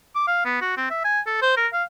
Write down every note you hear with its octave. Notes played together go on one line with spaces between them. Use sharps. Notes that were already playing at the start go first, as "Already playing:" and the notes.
D6
F5
B3
F#4
C4
E5
G#5
A4
C5
A#4
F5